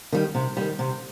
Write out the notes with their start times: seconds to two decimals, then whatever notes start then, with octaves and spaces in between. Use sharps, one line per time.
0.12 D#3 G3
0.35 C3
0.57 D#3 G3
0.79 C3